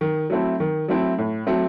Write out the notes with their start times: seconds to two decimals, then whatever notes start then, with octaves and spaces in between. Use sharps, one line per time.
0.01 D#3
0.30 F#3 A3 C4 E4
0.60 D#3
0.88 F#3 A3 C4 E4
1.18 A2
1.47 F#3 A3 C4